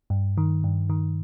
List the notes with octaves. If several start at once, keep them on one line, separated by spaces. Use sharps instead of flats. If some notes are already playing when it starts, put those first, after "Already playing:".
G2
D#3
G2
D#3